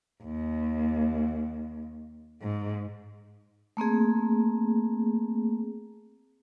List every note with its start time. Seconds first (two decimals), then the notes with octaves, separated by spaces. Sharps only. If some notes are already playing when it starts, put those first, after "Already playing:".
0.23 D#2
2.42 G#2
3.77 A3 A#3 C4 G#4